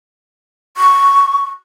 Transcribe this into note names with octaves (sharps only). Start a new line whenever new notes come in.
C#6